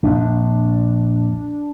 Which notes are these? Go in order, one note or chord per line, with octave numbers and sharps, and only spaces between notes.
A#1 F2 D4